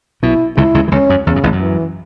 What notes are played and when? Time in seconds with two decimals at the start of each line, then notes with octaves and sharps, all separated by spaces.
0.23 B1 B2 E4
0.57 C#2 C#3 E4
0.74 C#2 C#3
0.88 E3
0.92 C#2 C#3 C#4
1.10 F#2
1.26 E2 C#3
1.36 F#2
1.43 A1 A2
1.52 F#2
1.60 E3